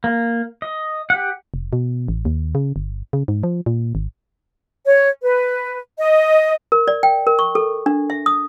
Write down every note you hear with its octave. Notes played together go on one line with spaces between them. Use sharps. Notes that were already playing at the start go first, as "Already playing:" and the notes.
A#3
D#5
G4 F#5
F1
B2
A1
D#2
C#3
G1
C#3
G#2
F3
A#2
G#1
C#5
B4
D#5
A#4
D5
G5
A#4
C#6
A4
D4
E5
D#6